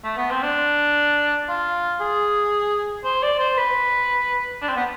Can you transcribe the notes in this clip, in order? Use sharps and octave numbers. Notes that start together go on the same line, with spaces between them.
A3
B3
C4
D4
F4
G#4
C5
D5
C5
B4
D4
C4
B3